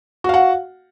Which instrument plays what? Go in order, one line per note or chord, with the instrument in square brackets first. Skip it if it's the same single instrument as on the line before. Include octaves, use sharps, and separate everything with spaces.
[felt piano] F#4
F5
F#5